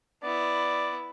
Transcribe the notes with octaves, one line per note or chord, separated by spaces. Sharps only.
B3 E4 D5